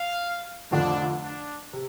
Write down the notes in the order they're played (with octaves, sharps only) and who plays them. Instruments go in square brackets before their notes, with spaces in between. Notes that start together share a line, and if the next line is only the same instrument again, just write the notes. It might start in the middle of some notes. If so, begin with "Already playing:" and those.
Already playing: [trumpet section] F5
[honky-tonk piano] F1 F2 D3 F3 A3 [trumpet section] D4
[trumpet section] D4
[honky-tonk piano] C3